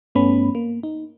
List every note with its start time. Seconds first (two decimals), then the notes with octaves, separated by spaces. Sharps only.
0.15 G2 A3 B3 C#4 B5
0.55 A#3
0.83 D#4